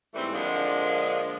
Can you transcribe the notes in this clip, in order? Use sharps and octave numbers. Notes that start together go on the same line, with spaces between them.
G#2 E3 G3 A3 C4
D3 F3 G#3 A#3 D4